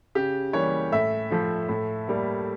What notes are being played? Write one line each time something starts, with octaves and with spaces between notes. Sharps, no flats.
C#3 G4
E3 G3 A#3 C#5
A2 E5
F3 A3
A2
G3 A#3